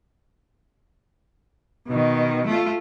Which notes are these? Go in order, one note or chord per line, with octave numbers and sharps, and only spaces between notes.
B2 D#3
A3 F4